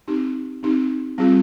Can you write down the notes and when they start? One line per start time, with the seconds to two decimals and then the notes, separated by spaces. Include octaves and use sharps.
0.08 C4 D#4 G4
0.63 C4 D#4 G4
1.18 G3 C4 F4 G#4